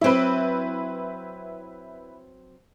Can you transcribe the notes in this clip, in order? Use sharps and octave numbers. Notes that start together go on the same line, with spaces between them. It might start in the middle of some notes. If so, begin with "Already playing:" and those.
F#3 C4 E4 B4